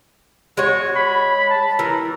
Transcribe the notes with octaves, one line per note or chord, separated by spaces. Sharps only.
G#3 F#4 C#5
B5
A5
E3 A#4